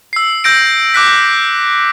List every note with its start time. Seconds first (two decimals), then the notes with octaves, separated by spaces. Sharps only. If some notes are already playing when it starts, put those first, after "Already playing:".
0.13 E6 C7
0.44 E6 G6 A#6 D7
0.94 D6 F#6 B6